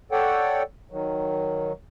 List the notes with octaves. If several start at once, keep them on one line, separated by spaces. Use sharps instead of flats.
A4 C#5 D5 F#5 G5
D#3 F#3